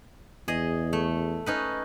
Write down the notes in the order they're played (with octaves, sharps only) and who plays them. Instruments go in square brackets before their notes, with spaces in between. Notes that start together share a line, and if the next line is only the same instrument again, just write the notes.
[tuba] E2 [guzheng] G#4 D#5
[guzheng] A3
C#4 D#4 B4